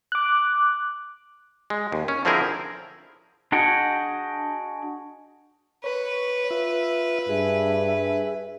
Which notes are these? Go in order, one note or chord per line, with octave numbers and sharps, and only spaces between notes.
D6 F#6
G#3
D#2
C#4
D3 F3 C4 E4 G#4 A#4
D4 F#4 G#4 D#5 F#5 G5
B4 C#5
F4 E5
G2 G#4 E5